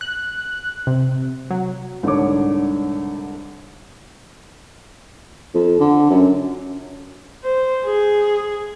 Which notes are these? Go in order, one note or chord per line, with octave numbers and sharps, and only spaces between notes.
F#6
C3
F#3
C2 G#2 D3 D4 C#5 D6
F2
D3
F#2
C5
G#4